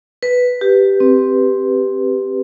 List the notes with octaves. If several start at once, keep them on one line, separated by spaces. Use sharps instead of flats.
B4
G4
C4